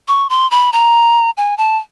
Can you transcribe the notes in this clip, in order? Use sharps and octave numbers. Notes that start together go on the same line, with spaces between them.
C#6
C6
B5
A#5
G#5
A5